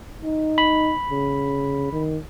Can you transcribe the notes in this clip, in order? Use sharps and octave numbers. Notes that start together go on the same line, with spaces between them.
D#4
B5
C#3
D#3